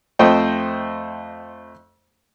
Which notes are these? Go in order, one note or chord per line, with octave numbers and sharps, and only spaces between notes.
F2 A3 C5 D#5 G5